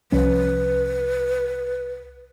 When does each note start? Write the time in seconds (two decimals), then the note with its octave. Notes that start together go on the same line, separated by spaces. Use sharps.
0.12 C2 F3 C#4 B4